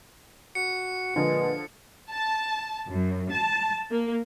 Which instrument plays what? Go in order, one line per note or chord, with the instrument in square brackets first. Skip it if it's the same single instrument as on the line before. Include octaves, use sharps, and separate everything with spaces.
[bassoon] F#4 [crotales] C#7
[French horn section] A#2 B4 [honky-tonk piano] D3 F3 [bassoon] G#3
[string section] A5
F#2
A5
A#3